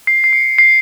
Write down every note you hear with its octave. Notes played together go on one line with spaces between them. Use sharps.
C7
C7
C#7
C7